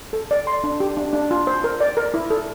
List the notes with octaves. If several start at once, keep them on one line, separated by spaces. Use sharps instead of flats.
A4
D5
C6
D4
G4
D4
D4
F4
C5
A#4
D5
A#4
E4
A4